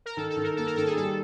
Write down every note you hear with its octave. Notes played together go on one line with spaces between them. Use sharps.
A#4
D#3 A4
A4
D#3
A#4
A#3 A4
A#4
D#3 A4
G#4
G3 A4